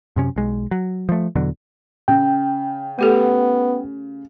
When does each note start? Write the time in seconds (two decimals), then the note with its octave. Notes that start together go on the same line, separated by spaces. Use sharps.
0.16 F#2 C3 C#4
0.36 B1 G#3
0.71 F#3
1.09 F3 A3
1.35 E2 B2 D3 F#3
2.08 C#3 G5
2.99 A3 B3 G4 A4